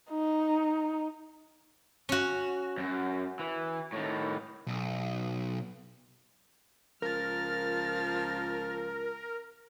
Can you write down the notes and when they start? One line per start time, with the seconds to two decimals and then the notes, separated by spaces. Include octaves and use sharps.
0.10 D#4
2.09 C#4 F#4
2.78 F#2
3.39 E3
3.93 A2 D#3
4.67 B1
7.02 C#2 F3 A#4 F6 A6